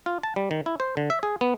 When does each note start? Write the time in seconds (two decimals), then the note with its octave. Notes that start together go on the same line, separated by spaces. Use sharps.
0.06 F4
0.23 A5
0.36 G3
0.51 D#3
0.66 E4
0.80 C5
0.97 D3
1.10 E5
1.23 G#4
1.41 B3